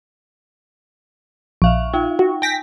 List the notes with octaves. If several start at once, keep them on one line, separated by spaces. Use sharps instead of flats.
A#1 E5 F5 C#6
D#4 F4 G5
F#4
G5 G#5 A#6 B6